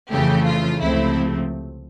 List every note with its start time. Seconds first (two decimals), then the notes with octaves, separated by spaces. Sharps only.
0.11 F2 C#3 E3 A3 G4
0.45 F4
0.79 C#2 C3 F3 A3 C4 E4